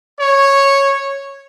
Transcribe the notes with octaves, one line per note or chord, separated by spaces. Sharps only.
C#5